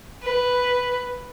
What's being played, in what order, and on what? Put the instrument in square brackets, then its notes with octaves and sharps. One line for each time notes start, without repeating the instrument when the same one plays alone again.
[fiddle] B4